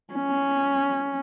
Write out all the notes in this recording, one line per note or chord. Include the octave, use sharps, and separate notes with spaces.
C#4